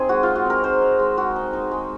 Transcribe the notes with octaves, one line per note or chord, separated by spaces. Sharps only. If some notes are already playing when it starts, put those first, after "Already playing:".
Already playing: C4 D#4 G#4
G#3 F#4
G#3 F4
F#4
C4 A#4
D#4 C5
D#4
G#3
G#3 F#4
D#4
D#4
G#3